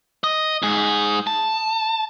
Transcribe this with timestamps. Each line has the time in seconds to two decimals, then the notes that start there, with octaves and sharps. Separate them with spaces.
0.24 D#5
0.62 G#2 G#4
1.27 A5